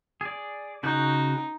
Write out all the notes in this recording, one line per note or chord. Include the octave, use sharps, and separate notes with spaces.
G#4 D5
C#3 D#4 F#4 G6